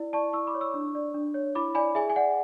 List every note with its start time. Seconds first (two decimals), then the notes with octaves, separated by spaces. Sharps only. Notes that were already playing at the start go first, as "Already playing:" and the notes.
Already playing: E4 D5
0.13 D5 A5 C#6
0.33 E4 C#6 E6
0.47 B5 D6
0.54 C#5
0.61 C#6 E6
0.74 D4
0.95 D5
1.14 D4
1.34 C#5
1.55 E4 B5 D6
1.75 D5 G#5 B5
1.95 G#4 E5 G#5
2.10 G#5
2.16 D5 F#5